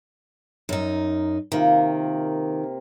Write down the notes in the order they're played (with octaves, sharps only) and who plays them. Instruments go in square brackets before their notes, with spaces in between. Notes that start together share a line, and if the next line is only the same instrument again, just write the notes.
[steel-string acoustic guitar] F#2 D#4
[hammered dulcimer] C3 A#3 F4 [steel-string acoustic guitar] D#3